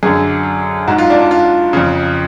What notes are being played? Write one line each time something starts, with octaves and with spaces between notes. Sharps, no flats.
F#2 D3 G#4
G#2 F#4
F4
D4
D4
F4
F2 C#3